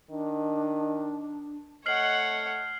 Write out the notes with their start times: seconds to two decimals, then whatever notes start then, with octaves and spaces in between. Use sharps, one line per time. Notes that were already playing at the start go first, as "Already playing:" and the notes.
0.10 D#3 D4
1.86 A3 C#5 D#5 F#5 F6 C7 F#7